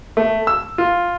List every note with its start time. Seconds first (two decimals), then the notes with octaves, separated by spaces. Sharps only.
0.17 A3
0.47 E6
0.78 F4